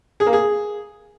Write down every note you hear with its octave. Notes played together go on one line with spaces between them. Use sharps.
G#4
A#3
G#4